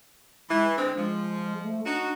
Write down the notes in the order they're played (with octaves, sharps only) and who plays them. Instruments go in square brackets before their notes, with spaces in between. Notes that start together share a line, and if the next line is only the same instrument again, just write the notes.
[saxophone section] E3 [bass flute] G#3
[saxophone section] D3 G#3 C4 [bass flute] D4
[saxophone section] F3 [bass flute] G#3
[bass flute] A3
[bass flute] D4 [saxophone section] D#4 F#4